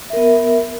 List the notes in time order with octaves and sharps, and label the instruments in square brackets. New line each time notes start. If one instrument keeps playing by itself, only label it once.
[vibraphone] E5
A#4
B3